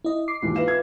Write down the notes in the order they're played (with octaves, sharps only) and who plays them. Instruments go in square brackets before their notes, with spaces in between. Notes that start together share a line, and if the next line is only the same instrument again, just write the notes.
[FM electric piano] E4 D#5
D6 C7
[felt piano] D#2 G#2 E3 [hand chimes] F4
[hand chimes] B4 E5 F5 [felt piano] E7
[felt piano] G#6